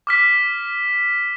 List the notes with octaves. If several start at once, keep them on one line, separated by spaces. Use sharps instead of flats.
D6 F6 B6